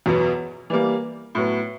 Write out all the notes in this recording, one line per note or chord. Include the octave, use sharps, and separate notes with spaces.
E2 B2 F#3 B3
E3 G3 A#3
A2 F#3 B3